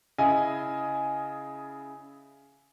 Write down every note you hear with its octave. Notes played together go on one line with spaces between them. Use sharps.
C#3 E4 D#5 G#5